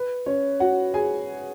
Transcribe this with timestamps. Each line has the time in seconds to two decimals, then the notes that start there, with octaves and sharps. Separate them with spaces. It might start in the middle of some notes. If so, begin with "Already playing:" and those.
Already playing: B4
0.26 C#4 C#5
0.60 F#4 F#5
0.94 G#4 G#5